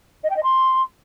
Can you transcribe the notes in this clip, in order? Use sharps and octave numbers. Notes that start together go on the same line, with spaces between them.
D#5
G5
D#5
C6